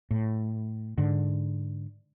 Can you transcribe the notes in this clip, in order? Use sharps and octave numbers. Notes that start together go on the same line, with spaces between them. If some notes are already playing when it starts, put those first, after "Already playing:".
A2
G#2 D3